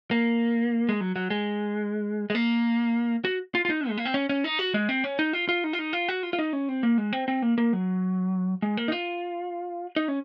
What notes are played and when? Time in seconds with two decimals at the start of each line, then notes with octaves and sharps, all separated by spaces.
0.11 A#3
0.89 G#3
1.01 F#3
1.16 F#3
1.30 G#3
2.30 G#3
2.35 A#3
3.25 F#4
3.55 F4
3.65 F4
3.70 D#4
3.89 G#3
3.97 A#3
4.05 C4
4.14 C#4
4.29 C#4
4.44 D#4
4.59 F#4
4.74 G#3
4.89 C4
5.04 C#4
5.19 D#4
5.33 F4
5.49 F4
5.64 D#4
5.73 F4
5.79 D#4
5.93 F4
6.09 F#4
6.23 F4
6.33 F4
6.39 D#4
6.53 C#4
6.69 C4
6.83 A#3
6.98 G#3
7.13 C4
7.28 C4
7.42 A#3
7.58 A#3
7.73 F#3
8.62 G#3
8.77 A#3
8.88 D#4
8.92 F4
9.96 D#4
10.08 C#4